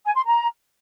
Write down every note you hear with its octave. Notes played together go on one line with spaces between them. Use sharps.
G#5
C6
A#5